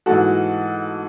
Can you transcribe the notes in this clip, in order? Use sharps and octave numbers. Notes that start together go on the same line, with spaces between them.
G#2 E3 F#4 A4